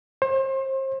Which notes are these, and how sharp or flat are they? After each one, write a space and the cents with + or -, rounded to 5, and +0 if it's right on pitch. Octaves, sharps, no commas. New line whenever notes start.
C5 +35